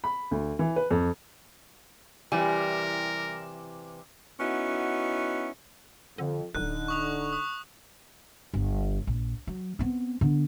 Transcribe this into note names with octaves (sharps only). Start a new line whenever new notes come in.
B5
D2
E3
B4
F2
C3 E3 G3 G4 A#4 G#5
B3 C#4 D#4 E4 F#4
F2 D3
D1 D3 D#4 F#6
C#6 D#6 F7
D#6
G1
A#1
F#3
B3 C4
D3 B3